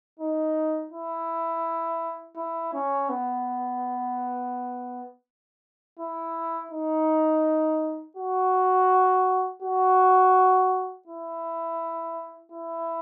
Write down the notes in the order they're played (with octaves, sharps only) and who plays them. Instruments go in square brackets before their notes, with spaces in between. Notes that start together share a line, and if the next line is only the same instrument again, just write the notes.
[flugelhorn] D#4
E4
E4
C#4
B3
E4
D#4
F#4
F#4
E4
E4